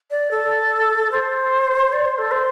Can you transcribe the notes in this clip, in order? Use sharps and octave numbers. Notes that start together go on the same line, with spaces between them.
D5
A4
C5
D5
C5
A4
C5